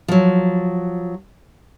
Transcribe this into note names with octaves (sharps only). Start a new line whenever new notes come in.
F3 F#3